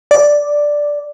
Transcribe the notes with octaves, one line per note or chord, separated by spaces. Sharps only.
D5